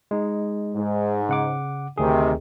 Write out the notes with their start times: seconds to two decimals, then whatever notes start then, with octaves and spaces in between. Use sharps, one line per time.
0.11 G#3 D#4
0.75 G#2
1.29 C#3 F#5 D6
1.98 D2 C3 D#3 G#4